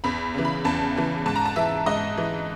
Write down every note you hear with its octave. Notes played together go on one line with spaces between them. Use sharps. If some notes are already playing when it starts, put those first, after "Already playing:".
E2 B5
C#3 E3
B5
E2 A5
C#3 E3
G#2 A5
A#5
A5
E3 E5
G#2 D#5
E3